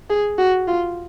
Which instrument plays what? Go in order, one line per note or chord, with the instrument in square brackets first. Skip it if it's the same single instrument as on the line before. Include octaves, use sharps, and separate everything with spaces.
[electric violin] G#4
F#4
F4